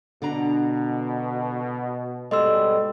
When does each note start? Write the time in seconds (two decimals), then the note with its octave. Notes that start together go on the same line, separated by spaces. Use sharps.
0.22 B2 D3 D4 A#5
2.31 G#2 B2 G3 G#3 A4 D#5 C6 E6